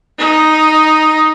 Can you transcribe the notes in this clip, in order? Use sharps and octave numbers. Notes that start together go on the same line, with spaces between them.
D#4